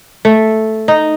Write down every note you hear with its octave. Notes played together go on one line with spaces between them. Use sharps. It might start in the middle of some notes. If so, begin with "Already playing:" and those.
A3
D#4